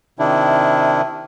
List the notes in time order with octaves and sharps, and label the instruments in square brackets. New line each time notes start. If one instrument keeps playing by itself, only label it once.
[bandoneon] C3 D#3 D4 E4